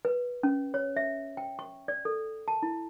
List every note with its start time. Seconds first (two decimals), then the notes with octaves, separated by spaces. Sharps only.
0.05 B4
0.43 C#4
0.74 C#5
0.96 E5
1.37 G5
1.59 C#6
1.88 D5
2.05 A4
2.48 A5
2.63 E4